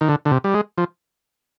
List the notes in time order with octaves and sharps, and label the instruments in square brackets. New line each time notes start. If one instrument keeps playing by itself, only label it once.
[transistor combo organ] D#3
D3
D3
C3
G3
G#3
F3